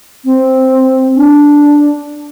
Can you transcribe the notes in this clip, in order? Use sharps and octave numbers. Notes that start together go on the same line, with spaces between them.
C4
D4